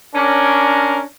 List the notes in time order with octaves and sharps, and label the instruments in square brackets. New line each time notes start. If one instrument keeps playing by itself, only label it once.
[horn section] C#4 D4 A#4